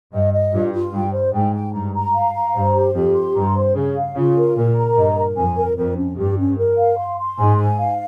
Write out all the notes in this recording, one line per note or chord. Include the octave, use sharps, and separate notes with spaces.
G2 D#5
D#5
G2 F4
F4
G2 G5
C5
G#2 G5
G5
G2 A#5
A#5
F5
A#5
G2 C5
G4
F2 G4
C6
G2 A#5
C5
C#3 G#4
F5
C#3 F4
A#4
A#2 A#4
A#5
G2 D#5
A#4
F2 G#5
A#4
F2 A#4
C#4
G2 G4
C#4
A#4
F5
C6
C6
G#2 G#5
G#5
F5